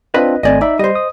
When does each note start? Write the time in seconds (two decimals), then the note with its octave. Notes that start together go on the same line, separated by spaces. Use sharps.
0.14 C4 D4 F4 B4 D#5 B5
0.43 G#1 A3 C4 D5 D#5 G#5
0.61 D#4 D5 E5 B5
0.79 G3 C5 D#5
0.95 D#6